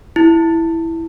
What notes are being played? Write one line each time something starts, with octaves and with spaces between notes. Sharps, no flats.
E4